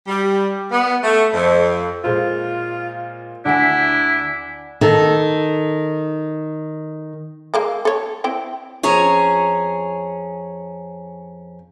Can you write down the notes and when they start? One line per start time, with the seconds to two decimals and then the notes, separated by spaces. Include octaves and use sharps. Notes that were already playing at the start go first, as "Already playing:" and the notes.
0.07 G3
0.71 B3
1.04 A3
1.33 F2
2.04 A#2 G#3 F4 C5
3.46 D2 D4 E4 F#5 G#5 B6
4.81 D#3 A4
7.54 G#3 A#3 A4
7.85 A4 C#5
8.24 C4 E4 G5
8.83 F2 C#4 G#4 C#5 A#5